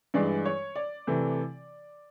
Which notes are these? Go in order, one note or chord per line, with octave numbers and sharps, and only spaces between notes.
G2 E3 G#3 D5
C#5
D5
C3 E3 A3